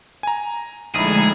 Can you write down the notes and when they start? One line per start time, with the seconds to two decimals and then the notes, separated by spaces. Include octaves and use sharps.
0.23 G#5 A#5
0.95 A#1 D3 G#3 A3 D#4 E4 G#4